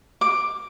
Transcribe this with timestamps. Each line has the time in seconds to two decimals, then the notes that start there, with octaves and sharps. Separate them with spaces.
0.21 D6